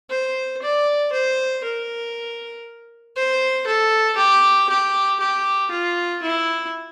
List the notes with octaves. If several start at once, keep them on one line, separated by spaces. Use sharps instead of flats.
C5
D5
C5
A#4
C5
A4
G4
G4
G4
F4
E4